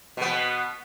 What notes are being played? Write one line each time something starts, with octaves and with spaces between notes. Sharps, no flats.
B2 B3